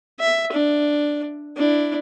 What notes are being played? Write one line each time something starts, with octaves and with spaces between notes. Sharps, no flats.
E5
D4
D4 E4